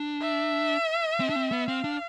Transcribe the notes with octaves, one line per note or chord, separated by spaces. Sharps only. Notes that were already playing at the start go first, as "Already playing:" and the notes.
Already playing: D4
E5
C4
D4
C4
B3
C4 F5
D4